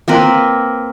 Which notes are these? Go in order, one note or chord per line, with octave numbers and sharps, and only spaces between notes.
A#3 C4 A#4 B4